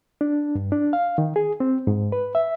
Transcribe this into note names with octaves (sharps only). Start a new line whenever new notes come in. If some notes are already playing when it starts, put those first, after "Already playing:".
D4
G2
D4
F5
D#3
G#4
C4
G#2
B4
E5